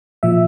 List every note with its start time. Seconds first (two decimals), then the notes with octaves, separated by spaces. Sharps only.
0.23 A#2 F3 E5